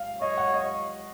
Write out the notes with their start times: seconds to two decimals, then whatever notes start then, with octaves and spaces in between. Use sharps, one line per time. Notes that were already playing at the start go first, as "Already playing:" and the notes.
Already playing: F5
0.21 C#5 D#5
0.37 F#5
0.54 D#5